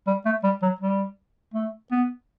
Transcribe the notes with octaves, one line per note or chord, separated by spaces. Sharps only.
G3
A3
G3
F#3
G3
A3
B3